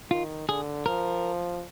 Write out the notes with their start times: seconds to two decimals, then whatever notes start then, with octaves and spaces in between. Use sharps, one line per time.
0.11 D#3 F4
0.49 D3 G#4
0.86 F3 A#4